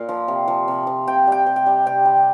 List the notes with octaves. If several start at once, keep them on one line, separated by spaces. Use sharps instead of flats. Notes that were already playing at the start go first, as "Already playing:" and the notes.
Already playing: A#2 D#5 F5
F3
C3
F3
C3
F3
C3 G5
G3 G5
C3
G5
G3
C3 G5
G3